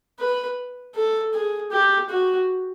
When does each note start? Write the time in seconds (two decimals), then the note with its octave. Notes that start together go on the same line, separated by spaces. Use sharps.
0.19 B4
0.95 A4
1.33 G#4
1.71 G4
2.09 F#4